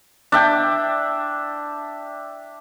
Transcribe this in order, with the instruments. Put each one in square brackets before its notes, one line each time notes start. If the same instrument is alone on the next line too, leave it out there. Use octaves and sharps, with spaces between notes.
[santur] D4 E5 G5